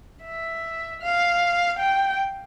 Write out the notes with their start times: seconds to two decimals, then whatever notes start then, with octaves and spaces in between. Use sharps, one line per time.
0.23 E5
1.01 F5
1.79 G5